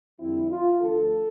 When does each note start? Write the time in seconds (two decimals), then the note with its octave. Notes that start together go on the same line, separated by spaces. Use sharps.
0.20 F2 D3 G3 C4 E4
0.50 F4
0.81 D2 D3 F3 A4